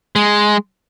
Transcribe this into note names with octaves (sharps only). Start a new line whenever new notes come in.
G#3